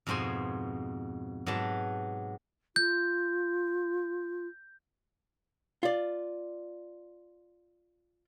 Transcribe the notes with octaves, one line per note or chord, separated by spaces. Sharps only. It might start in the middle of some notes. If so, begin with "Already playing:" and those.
F2 G#2 B2 C5 G#5
G#2 F#3 G4 B4 A5
F4 G6
F4 D5